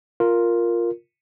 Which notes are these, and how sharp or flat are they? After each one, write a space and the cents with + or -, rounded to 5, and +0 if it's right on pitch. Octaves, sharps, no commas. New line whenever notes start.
F4 +0 A#4 +0